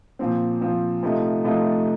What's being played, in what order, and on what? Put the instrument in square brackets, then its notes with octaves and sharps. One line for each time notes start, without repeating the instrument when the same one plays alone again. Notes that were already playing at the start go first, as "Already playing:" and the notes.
[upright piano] A#2 F3 C4
A#2 F3 C4
C3 F3 A3 D#4
C3 F3 A3 D#4